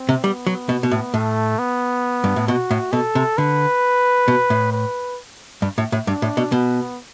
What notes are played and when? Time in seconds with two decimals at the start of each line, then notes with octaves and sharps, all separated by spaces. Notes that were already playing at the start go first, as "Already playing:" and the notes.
Already playing: C4
0.09 C3
0.24 G3 B3
0.47 F#3
0.69 B2
0.83 B2
0.91 A2
1.14 A2 A3
1.59 B3
2.24 G2
2.36 A2
2.48 B2 F#4
2.71 A2
2.93 B2 A4
3.15 C3
3.38 D3 B4
4.28 B2
4.50 A2
4.72 B4
5.62 G2
5.78 A2
5.92 A2
6.07 G2 D4
6.22 A2
6.37 B2
6.52 B2 B3